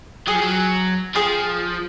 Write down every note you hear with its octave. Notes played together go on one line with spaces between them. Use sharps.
F#3 G#4
F3
F#3
F3 G#4